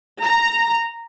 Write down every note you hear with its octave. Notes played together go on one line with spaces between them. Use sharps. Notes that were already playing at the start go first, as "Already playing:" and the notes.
A#5